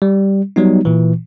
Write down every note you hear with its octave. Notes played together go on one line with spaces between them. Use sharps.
G3
F#3 G3 B3 D#4
A#2 E3